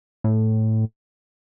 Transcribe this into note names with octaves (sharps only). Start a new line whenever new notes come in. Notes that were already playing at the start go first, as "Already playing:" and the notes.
A2